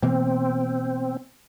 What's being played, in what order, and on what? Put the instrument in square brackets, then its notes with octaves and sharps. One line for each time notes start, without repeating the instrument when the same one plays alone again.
[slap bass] B2 E3 A#3 [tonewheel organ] C4